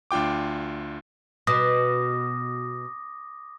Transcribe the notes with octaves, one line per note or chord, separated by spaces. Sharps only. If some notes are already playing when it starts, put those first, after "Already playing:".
D2 D4 F4 G5 D6
B2 D6 D#6 A#6